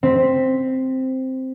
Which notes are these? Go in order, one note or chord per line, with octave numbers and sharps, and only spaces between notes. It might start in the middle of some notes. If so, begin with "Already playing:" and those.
C4 B6